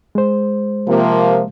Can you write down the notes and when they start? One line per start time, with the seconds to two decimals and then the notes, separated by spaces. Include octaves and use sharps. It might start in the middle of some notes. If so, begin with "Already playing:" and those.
0.15 G#3 C5
0.88 C3 F3 A#3